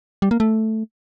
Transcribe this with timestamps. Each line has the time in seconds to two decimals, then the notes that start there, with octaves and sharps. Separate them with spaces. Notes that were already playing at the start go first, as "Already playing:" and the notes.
0.22 G3
0.31 A#3
0.40 A3